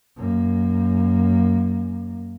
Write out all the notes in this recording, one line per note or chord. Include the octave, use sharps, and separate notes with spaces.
F#2 A#3